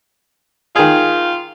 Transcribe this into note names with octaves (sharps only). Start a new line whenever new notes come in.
D#3 F4 G#4